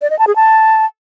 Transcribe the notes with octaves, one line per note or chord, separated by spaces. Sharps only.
D5
D#5
A5
G#4
A5